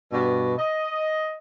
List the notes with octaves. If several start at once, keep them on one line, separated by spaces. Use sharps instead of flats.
G2 B2
D#5